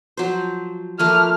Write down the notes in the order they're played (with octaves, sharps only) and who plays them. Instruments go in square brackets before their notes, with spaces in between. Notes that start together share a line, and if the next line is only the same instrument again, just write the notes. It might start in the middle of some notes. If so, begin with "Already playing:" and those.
[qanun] F3 F#3 C5
[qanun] F3 A3 A#3 [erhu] F6